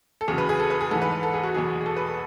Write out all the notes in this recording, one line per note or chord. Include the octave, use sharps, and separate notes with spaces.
A4
E2 C#3 F#3 G#4
B4
G#4
A4
B4
G#4
G#2 E3 A4
B4
B4
A4
G#4
F#4
E2 B2 F#3 G#4
G#4
A4
B4
A4